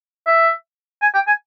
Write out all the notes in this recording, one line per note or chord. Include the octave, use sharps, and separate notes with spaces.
E5
G#5
G5
G#5